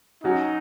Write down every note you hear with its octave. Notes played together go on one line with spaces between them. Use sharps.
F#3 C#4 D#4 F#4